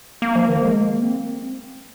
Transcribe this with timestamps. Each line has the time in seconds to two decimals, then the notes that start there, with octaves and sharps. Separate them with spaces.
0.22 A#3
0.35 F3
0.48 D#3
0.57 A#3
0.62 G#3
0.82 A#3
1.03 C4